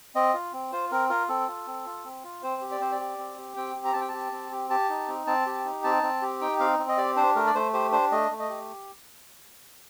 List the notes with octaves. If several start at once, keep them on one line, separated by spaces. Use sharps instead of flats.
C4 D#5
F4
C4
F4 C5
C4 A#4
F4 A#4
C4 A4
F4
C4
F4
C4
F4
C4 C5
G4
D5
C4 C5
D5
G4
C4
G4
C4 G5
G4
A#5
C4 A5
G5
G4 A5
C4
G4
G4 A5
D#4
C4
C4 A5
G4
D#4
C4 A5
C4
G4
D#4 G5
C4 F5
C4
D#5
G4 D5
D4 C5
A3 A#4
D5
A3 C5
G4 C5
D4 C5
A3 D#5
A3
D#5
G4